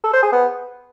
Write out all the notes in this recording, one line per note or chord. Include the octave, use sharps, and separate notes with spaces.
A4
C5
G#4
B3